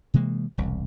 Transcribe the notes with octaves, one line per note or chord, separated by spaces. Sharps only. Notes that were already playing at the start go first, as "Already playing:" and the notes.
C3 E3 G#3 A#3
E1 C2